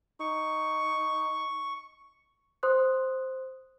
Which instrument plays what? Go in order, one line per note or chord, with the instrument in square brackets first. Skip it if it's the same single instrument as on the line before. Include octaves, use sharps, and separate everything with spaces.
[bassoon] D#4 [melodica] C#6
[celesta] C5 C6 D#6 F#6